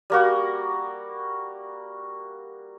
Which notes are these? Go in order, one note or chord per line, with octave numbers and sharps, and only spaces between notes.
G3 A#3 F#4